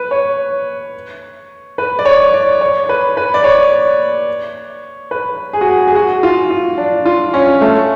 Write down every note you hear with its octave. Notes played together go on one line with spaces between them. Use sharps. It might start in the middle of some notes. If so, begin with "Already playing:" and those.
Already playing: B4
C#5
B4
D5
C#5
D5
C#5
B4
B4
D5
C#5
B4
G#4
F#4
G#4
G#4
F#4
F4
F4
D4
F4
C#4
A3